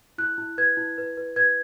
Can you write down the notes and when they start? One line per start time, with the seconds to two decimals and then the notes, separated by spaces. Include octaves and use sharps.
0.18 E4 F#6
0.38 E4
0.58 B4 G#6
0.77 E4
0.98 B4
1.17 B4
1.36 B4 G#6